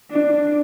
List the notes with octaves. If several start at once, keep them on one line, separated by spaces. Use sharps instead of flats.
D4